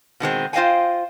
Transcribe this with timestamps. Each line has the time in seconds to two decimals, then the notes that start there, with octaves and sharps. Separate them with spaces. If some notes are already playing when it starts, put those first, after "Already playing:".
0.20 B2 D#3 G#3 C4
0.53 F4 C5 D#5 F5 G5 G#5